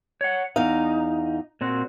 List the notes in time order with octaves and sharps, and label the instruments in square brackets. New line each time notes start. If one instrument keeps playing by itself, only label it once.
[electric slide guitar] C#5 F#5
[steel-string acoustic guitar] E2 F5 [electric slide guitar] D#4
[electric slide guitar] A#2 C4 F#4